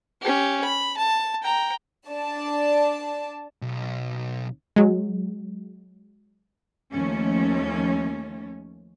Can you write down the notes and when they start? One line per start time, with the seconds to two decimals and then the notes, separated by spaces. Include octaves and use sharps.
0.21 C#4 G4
0.64 B5
0.98 A5
1.43 G5 A#5
2.09 D4 D5 A5
3.62 B1
4.76 F#3 G#3
6.91 D#2 F3 A3 C#4